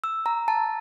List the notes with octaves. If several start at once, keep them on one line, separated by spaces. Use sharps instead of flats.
E6
A#5
A5